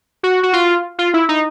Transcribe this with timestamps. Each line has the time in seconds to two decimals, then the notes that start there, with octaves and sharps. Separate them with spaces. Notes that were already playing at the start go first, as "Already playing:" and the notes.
0.23 F#4
0.43 F#4
0.53 F4
0.99 F4
1.14 E4
1.29 D#4